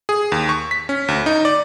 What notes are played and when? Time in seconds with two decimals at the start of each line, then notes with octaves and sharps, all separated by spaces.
0.09 G#4
0.32 D#2
0.49 C#6
0.71 B6
0.89 C#4
1.08 D2
1.26 D#4
1.45 D5